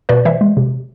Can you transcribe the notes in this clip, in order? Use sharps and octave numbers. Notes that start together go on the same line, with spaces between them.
B2 B4 D5
E3 C5 E5
G#3
C3